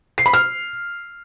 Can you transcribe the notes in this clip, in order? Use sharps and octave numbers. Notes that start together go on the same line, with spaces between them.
C7
B5
F6